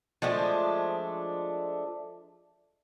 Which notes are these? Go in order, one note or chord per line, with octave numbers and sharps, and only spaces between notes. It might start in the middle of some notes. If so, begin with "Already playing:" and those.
F3 G#3 A3 D4